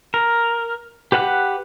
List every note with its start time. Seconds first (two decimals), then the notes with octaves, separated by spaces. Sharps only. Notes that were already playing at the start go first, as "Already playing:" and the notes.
0.14 A#4
1.12 G4 B4 F#5 A5 F#6